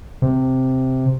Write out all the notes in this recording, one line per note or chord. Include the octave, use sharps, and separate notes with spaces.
C3